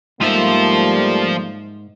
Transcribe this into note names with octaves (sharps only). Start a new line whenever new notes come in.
G#2 F3 G3 A3 A#3 C5 E5